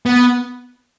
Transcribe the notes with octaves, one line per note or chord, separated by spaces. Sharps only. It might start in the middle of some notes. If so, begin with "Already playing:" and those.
B3